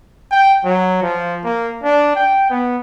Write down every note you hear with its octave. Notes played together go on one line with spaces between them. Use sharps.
G5
F#3
F3
A#3
D4
G5
B3